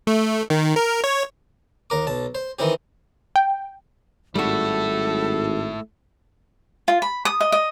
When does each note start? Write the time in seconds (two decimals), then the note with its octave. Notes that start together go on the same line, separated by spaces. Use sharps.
0.07 A3
0.50 D#3
0.76 A#4
1.04 C#5
1.90 D#2 A#4 D6
2.07 B1 A5
2.35 C5
2.59 D#3 E3 C4 G4
3.36 G5
4.35 G#1 G3 A3 E4 F#4 A4
6.88 F4
7.02 B5
7.25 D#6
7.41 D#5
7.52 D#5